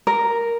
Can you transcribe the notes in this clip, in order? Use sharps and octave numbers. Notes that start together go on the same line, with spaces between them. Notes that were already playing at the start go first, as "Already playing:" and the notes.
A#4